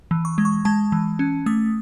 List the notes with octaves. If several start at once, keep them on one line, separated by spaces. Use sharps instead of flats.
E3
C#6
G#3
C#6
G#3 A5
E3
C#4
A3 D#6